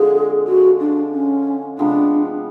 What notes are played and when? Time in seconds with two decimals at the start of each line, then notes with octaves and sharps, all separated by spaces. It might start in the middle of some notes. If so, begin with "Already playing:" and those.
Already playing: D3 F3 G#3 C4 G#4
0.47 F#4
0.80 D4
1.13 C#4
1.78 C3 F3 G#3 B3 D4